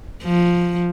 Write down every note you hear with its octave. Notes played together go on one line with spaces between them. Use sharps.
F3